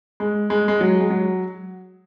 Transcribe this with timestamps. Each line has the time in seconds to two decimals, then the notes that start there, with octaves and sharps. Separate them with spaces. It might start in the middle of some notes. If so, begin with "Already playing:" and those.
0.20 G#3
0.50 G#3
0.68 G#3
0.81 F#3
1.00 G#3
1.10 F#3